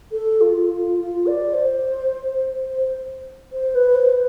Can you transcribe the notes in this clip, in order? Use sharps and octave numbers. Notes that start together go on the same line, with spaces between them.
A4
F4
F4
F4
D5
C5
C5
C5
B4
C5